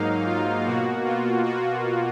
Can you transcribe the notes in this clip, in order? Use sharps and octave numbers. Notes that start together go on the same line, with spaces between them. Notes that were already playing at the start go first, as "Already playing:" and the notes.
Already playing: G#2 F#3 A#3 D#4 F5
F4
B2 A#3 F#4
F4
F#4